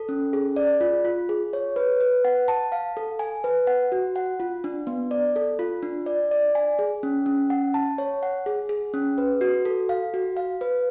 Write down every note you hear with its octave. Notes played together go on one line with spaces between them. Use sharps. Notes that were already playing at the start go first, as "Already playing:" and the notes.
Already playing: A4
C#4
G#4
D5
F4
F4
G#4
C#5
B4
B4
F#5
A5
F5
A4
G#5
B4
F#5
F#4
F#5
F4
D4
B3
D5
A4
F4
D4
D5
D5
G#5
G#4
C#4
C#4
F#5
A5
C#5
F#5
G#4
G#4
C#4
B4
F#4
A4
F5
F#4
F5
B4